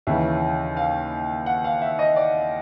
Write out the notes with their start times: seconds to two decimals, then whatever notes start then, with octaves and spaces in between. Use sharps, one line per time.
0.07 D#2 C#3 E3 E5
0.77 F5
1.46 F#5
1.64 F5
1.82 E5
1.99 D#5
2.16 D5